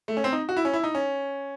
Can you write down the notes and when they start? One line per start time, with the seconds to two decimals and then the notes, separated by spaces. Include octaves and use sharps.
0.08 A3
0.17 C#4
0.24 C4
0.33 D#4
0.49 F#4
0.57 E4
0.65 C#4
0.73 E4
0.84 D#4
0.95 C#4